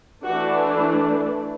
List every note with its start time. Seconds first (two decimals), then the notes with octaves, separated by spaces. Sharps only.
0.23 E3 A3 D4 F#4